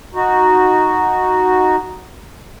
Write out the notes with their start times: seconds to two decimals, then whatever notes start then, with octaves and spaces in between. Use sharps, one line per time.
0.14 D#4 F#4